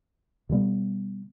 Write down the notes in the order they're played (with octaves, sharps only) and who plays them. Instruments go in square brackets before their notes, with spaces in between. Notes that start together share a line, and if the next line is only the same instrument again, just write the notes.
[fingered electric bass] B2 D3 G3 B3